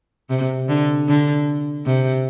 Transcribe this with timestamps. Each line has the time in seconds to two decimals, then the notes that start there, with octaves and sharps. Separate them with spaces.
0.30 C3
0.69 D3
1.08 D3
1.86 C3